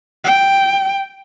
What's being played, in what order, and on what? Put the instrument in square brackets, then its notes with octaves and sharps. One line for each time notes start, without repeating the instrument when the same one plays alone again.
[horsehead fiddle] G5